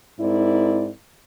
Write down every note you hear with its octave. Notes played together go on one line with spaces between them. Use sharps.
G#2 C4 E4 A#4 D5